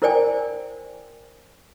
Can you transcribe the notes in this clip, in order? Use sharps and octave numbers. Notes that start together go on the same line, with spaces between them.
E4 A#4 C5 D5 G5 G#5